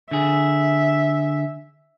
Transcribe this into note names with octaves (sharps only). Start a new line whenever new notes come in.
D3 G#4 E5